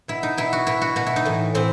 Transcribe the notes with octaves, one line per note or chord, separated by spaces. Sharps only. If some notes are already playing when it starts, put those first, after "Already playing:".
B2 E4
D#4
B2 E4
F#4
B2 E4
F#4
B2 F#4
E4
D#4
A2 E3
A2 E3 C4